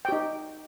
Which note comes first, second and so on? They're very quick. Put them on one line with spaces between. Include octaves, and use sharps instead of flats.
G5 G4 D#4